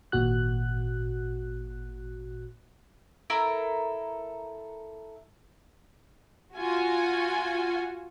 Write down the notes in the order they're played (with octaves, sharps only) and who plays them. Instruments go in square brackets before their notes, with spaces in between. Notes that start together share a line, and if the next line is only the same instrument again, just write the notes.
[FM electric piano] G#1 A#2 F#4 F#6
[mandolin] E4 A4 A#4
[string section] F4 F#4 G#5